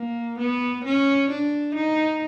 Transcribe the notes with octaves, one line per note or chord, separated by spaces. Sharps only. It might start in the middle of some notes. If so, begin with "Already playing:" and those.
Already playing: A#3
B3
C#4
D4
D#4